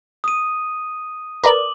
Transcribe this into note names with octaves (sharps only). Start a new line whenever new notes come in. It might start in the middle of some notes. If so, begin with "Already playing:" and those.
D#6 D#7
A#4 B4 D5 D6 F#7